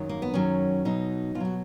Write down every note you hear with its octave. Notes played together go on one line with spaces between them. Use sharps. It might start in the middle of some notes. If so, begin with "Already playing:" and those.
Already playing: F#2 D#3 F#3
A#3
B3
F#2 D#3 F#3 C#4
B2 F#3 D#4
B2 F4
F#3 F#4